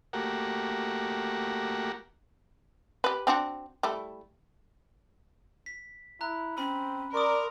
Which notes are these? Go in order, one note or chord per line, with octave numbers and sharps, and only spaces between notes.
A3 A#3 F#4 G4 A#4 F#5
G4 B4
C4 D4 F#4
G3 A3 E4
B6
E4 A#5 F#6
C4 C#4 B5
A#4 D5 C6 C#6 D#6